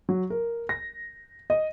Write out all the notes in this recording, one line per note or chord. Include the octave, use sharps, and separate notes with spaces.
F#3
A#4
A#6
D#5